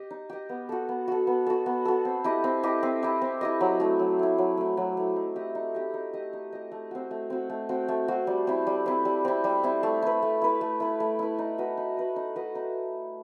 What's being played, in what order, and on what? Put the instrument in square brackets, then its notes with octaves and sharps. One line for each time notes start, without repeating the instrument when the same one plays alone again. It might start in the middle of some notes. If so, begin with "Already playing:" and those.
Already playing: [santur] G4 D#5
D#4
G4 D#5
B3
F#4 A4
B3
F#4 A4
B3
F#4 A4
B3
F#4 A4
C4
E4 G4 D#5
C4
E4 G4 D#5
C4
E4 G4 D#5
C4
E4 G4 D#5
F#3
A3 E4
F#3
A3 E4
F#3
A3 E4
F#3
A3 E4
D#4
G4 D#5
D#4
G4 D#5
D#4
G4 D#5
D#4
G4 D#5
A3
C4 F#4
A3
C4 F#4
A3
C4 F#4
A3
C4 F#4
G3
C4 E4
G3
C4 E4
G3
C4 E4
G3
C4 E4
A3
E4 B4
A3
E4 B4
A3
E4 B4
A3
E4 B4
D#4
F#4 B4 D#5
D#4
F#4 B4 D#5
D#4
F#4 B4 D#5
D#4